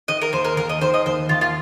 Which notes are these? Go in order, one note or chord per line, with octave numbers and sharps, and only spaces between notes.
D#3 D#5
A#4
D#2 C5
A#4
D#2 A#4
D#5
D#3 C5
D#5
D#2 C5
D#2 F4
F4